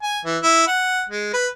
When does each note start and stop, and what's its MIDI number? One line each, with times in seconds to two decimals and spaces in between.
0.03 0.20 80
0.25 0.38 52
0.43 0.67 64
0.68 1.03 78
1.09 1.31 56
1.33 1.47 71